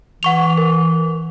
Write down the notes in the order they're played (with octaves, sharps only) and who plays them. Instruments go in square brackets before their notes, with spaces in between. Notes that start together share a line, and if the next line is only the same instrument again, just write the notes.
[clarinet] E3 [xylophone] F#5 C#6 F7
[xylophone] A#4